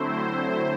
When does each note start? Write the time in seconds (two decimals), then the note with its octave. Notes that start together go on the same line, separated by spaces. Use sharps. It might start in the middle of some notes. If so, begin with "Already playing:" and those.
Already playing: D3 F#3 A3 C4 E4 C5
0.12 C5